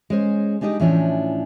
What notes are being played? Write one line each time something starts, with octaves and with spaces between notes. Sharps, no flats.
G#3 C#4 C5
G#3 D4 D#4 G4 D#5
A2 E3 F3 C#4 D4